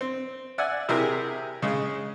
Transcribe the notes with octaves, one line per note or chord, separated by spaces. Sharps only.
C4
D5 E5 F#5 G#5
C3 E4 G4 G#4 A#4
C#3 G#3